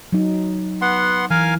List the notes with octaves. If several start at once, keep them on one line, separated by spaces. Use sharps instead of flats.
F#3 D#4
B3 F#5 C6
E3 A#4 F5 G#5